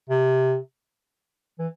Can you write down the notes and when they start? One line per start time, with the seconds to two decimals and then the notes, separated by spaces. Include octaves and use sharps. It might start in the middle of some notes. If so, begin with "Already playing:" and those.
0.09 C3
1.59 E3